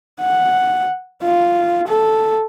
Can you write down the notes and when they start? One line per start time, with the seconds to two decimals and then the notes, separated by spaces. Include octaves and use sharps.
0.21 F#5
1.23 F4
1.88 A4